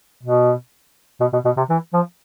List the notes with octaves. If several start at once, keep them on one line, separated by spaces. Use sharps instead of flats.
B2
B2
B2
B2
C3
E3
F3